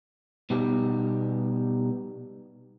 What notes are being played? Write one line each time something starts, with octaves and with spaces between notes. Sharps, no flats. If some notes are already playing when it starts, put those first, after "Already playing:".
B2 G3 B3 D#4 G4